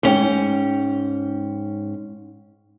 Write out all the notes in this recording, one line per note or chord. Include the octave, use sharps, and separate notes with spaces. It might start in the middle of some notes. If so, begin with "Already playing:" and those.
G#2 C#4 G5